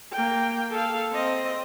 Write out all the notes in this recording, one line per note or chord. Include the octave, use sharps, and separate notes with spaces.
A#3 G5
A4 F5
C4 D#5